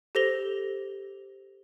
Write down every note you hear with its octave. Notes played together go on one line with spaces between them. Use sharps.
G4 A4 C5 A#6 F7 G7